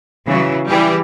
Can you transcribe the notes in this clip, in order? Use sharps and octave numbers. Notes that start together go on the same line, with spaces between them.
C#3 E3 F#3
E3 G3 G4 G#4